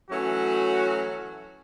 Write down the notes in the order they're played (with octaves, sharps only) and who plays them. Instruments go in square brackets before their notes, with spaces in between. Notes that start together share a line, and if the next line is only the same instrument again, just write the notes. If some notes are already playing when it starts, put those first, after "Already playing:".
[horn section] E3 F#3 A3 C#4 F#4